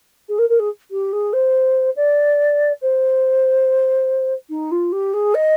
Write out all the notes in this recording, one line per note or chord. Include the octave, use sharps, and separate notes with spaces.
G#4
A#4
A#4
G#4
G4
G#4
C5
D5
C5
D#4
F4
G4
G#4
D#5